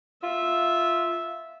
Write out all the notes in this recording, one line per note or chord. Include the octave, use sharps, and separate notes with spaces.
F4 E5